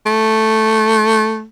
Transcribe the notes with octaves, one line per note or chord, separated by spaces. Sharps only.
A3